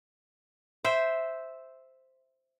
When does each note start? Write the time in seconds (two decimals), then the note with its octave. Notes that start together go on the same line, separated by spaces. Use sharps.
0.84 C5 E5 G5